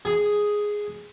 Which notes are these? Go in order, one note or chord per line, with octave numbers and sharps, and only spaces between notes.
G#4